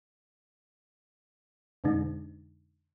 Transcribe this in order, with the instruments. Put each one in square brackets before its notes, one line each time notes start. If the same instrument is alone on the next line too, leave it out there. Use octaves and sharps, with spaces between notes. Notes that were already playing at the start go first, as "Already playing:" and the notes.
[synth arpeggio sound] F2 B2 D3 G#3 D4 D#4